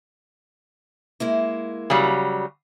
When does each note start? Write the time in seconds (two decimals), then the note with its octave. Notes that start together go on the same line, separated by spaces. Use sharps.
1.20 G#3 A#3 E4
1.90 C#3 F#3 G3